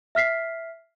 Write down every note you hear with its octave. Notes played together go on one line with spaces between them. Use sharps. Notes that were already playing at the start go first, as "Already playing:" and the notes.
E5 F6 B6 C7